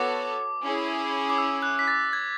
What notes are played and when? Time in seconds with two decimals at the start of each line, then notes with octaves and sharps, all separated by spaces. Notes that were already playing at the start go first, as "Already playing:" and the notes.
Already playing: B3 F#4 A4 C#5 D6
0.63 C#4 E4 G#4
1.30 D6
1.38 E6
1.62 F#6
1.79 B6
1.88 A6
2.13 G#6